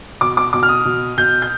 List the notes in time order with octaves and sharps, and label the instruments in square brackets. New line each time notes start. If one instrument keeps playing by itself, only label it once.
[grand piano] B2 D6
D6
B2 D6
F6
D#6
B2
B2 G6
G6